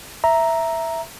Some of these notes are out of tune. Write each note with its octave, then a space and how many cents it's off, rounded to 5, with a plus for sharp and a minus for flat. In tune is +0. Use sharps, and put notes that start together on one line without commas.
E5 +0 A#5 +0